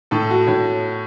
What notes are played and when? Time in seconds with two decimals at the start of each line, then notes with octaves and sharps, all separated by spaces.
0.11 A2 A4
0.30 F#4
0.47 A2 C#5